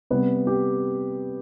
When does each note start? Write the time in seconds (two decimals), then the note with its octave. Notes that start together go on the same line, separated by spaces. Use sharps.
0.11 C3 G3 B3 B4
0.47 G4